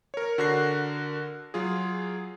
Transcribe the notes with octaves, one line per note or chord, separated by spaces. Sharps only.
A#4 C#5
D3 F#4 A#4 F#6 A#6 C7
F#3 F4 G#4